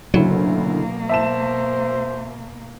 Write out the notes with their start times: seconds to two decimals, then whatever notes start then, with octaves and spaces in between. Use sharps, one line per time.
0.14 F#1 D2 B2 F#3 A#3 E4
1.09 C5 E5 A5 E7